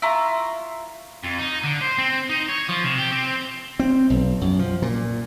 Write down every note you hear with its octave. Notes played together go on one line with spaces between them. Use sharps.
E4 F4 A#5 C#6
F2
D#4
D3
C5
C4
D#4
C#5
F3
C3
G4
C4
C4
B1
F#2
F3
A#2